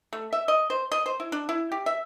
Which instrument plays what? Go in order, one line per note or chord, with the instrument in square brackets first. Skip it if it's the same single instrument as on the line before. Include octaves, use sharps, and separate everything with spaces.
[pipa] A3
E5
D#5
C5
D#5
C5
E4
D4
E4
G4
E5